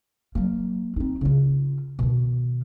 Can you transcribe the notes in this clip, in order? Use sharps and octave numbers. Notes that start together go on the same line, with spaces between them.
F#3 A#3
C4 D#4
C#3 F4
B2 D#3